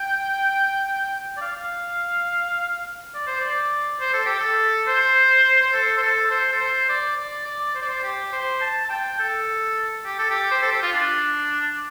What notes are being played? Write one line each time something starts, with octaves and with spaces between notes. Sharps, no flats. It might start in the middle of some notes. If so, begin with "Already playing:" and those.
Already playing: G5
D5
F5
D5
C5
D5
C5
A4
G4
A4
C5
C5
A4
C5
A4
C5
A4
C5
D5
D5
D5
C5
D5
C5
G4
C5
A5
A5
G5
A4
G4
A4
G4
C5
A4
G4
F4
D4